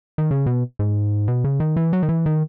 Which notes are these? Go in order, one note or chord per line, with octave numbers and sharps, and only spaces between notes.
D#3
C#3
B2
G#2
B2
C#3
D#3
E3
F#3
D#3
E3
D#3